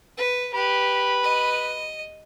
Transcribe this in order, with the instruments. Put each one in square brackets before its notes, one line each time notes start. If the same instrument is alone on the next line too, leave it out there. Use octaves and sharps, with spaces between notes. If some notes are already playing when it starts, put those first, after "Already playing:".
[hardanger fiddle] B4
[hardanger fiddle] G4 [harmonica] B4 B5
[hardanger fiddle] D#5